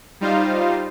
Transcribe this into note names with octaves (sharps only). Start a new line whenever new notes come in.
G3 D#4 F4 C5 F5